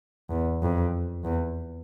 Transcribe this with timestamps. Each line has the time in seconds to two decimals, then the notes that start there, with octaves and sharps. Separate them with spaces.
0.30 E2
0.62 F2
1.25 E2